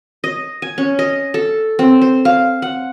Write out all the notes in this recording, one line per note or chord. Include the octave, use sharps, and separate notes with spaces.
D#5
G#5
C#4
D#5
A4
C4
C5
F5
F#5